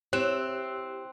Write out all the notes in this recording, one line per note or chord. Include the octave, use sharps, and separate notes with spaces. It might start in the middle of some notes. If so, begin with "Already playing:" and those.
C4 E4 G4 C#5 F#6 E7